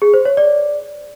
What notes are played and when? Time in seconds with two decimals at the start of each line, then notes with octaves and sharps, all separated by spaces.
0.02 G#4
0.14 C5
0.25 C#5
0.37 D5